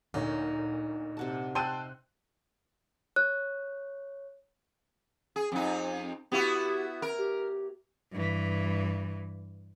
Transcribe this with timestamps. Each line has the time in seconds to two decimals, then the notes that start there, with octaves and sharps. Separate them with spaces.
0.14 D2 A#2 D#4 C#5
1.17 C3 F#5 A5
1.55 C4 G5 A5 C6 E6 F#6 D#7
3.16 C#5 F#6
5.36 G#4
5.52 F2 D#4
6.32 B3 E4 F#4 G4
7.02 A#4
7.18 G4
8.12 G2 E3